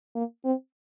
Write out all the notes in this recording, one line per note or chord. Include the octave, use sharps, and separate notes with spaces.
A#3
C4